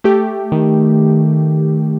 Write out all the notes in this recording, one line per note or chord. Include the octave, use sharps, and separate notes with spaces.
A3 G4
D#3